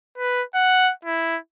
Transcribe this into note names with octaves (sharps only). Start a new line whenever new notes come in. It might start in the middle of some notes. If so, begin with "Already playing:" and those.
B4
F#5
E4